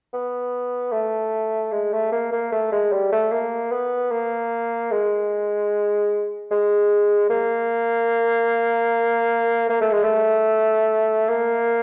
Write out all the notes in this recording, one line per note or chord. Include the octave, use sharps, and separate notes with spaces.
B3
A3
G#3
A3
A#3
A#3
A3
G#3
G3
A3
A#3
B3
A#3
G#3
G#3
A#3
A#3
A3
G#3
A3
A#3